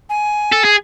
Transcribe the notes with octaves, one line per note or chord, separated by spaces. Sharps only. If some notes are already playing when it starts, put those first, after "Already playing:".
G#5
A4
G#4